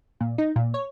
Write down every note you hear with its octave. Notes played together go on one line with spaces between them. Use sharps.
A#2
D#4
A#2
C#5